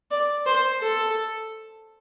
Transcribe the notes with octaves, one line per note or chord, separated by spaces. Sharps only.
D5
C5
A4